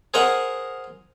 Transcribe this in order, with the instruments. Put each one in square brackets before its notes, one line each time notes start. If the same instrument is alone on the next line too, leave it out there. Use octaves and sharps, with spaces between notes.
[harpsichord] G#4 A#4 C5 D#5 F#5